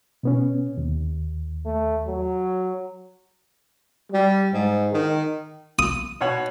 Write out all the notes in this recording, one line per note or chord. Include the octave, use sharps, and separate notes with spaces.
B2 B3 C#4
D#2
A3
F#3
G3
G#2
D#3
D#6
B2 C#5 F#5